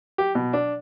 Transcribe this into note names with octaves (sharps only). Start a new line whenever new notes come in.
G4
B2
D4